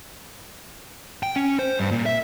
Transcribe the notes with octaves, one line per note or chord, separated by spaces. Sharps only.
G5
C#4
C5
G2
A#2
E5